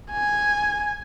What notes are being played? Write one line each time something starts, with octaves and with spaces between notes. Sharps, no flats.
G#5